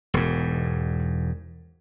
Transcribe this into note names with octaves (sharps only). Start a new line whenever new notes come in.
E1 G#2